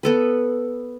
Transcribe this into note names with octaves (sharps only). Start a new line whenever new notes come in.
B3 A4 B4